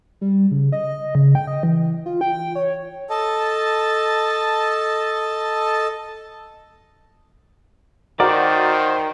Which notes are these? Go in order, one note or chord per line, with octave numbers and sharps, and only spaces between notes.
G3
C#3
D#5
C#3
G5
D#5
E3
F4
G5
C#5
A4 D#5 A5
D#3 F#4 A#4 C5 D5 D6